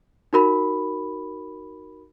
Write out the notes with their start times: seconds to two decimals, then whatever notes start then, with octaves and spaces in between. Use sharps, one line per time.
0.33 D#4 F#4 A#4 B5